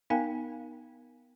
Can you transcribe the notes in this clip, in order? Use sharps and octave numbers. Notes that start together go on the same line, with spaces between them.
B3 D#4 A#4 F5 G5 G#5